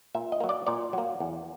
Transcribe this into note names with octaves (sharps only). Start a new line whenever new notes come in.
A#2 E5
D#5
F#3 A#3
D5
A#2 D5
F#3 A#3
E2